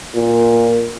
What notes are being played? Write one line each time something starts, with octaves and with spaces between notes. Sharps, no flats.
A#2